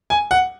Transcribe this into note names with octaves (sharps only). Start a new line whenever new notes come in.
G#5
F#5